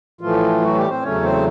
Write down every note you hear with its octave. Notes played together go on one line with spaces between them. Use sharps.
A2 E3 F3 A3 F4
F#3 F#4
G3 G4
C4 C5
E2 C#3 F#3 A3 C#4 C#5
C4 C5